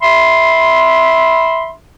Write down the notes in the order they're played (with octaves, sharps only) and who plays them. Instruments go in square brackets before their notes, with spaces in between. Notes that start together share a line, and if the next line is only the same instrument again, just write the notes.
[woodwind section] E5 B5 C6